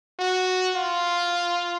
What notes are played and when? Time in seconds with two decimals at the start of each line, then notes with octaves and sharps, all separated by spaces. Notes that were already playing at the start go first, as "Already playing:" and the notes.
0.19 F#4
0.76 F4